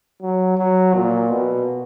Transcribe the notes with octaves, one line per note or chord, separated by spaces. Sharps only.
F#3
F#3
A#2
B2